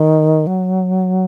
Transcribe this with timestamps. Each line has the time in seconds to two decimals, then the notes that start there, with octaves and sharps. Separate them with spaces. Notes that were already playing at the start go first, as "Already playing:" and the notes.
Already playing: D#3
0.47 F#3